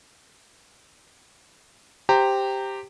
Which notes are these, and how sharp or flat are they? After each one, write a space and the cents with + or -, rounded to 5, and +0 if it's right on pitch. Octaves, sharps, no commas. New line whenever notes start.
G4 +0 C5 +0 A#5 -25